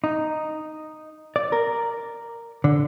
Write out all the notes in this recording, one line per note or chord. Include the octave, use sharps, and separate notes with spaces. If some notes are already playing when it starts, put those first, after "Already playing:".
D#4
D5
A#4
D3